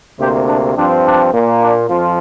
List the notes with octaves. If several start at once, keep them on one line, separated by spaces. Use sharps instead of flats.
D2 C3 A#3 G4 C5
D4
G2 F3 C4 D4
D4
A#2 A#3
D4
F2 F3 F4